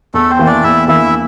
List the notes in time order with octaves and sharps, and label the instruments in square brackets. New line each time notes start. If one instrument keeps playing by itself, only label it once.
[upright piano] E2 [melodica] A3 A4
[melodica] C4 C5
[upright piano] E3 A#3
[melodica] D4 D5
[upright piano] E2 [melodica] E4 E5
[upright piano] E3 A#3 [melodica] E4 E5